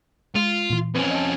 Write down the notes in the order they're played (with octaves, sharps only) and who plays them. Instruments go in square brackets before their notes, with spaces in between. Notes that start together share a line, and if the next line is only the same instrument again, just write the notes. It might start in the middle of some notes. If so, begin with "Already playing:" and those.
[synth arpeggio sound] G#3 [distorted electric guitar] F4
[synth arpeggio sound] A#2 E3
[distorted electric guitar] F2 C#4 [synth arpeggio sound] B4
[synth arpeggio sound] D#5 A5